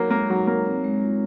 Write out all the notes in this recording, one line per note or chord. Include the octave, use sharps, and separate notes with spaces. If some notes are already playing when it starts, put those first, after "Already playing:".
Already playing: F#3 A#3 D#4 A#4 C#5
G#3 A#3
F#3 D#4
A#3 C#5
C4
G#3
F4